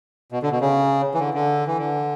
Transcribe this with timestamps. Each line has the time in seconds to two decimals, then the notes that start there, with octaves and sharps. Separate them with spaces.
0.32 B2
0.42 D3
0.52 B2
0.61 C#3
1.14 E3
1.20 D3
1.34 D3
1.67 E3
1.78 D3